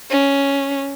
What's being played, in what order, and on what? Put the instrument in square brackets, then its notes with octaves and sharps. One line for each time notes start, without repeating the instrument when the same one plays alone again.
[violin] C#4